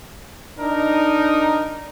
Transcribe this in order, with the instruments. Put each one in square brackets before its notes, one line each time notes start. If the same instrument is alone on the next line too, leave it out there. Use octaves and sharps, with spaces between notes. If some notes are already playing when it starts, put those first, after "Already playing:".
[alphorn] D4 [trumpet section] D#4 [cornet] A#4